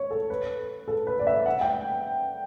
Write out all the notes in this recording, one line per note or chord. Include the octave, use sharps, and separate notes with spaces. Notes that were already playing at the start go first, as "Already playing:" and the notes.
Already playing: C#5
A4
B4
A4
B4
D5
E5
F#5
G5